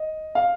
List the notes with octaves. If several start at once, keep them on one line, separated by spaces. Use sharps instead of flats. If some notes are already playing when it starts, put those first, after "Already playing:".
Already playing: D#5
F5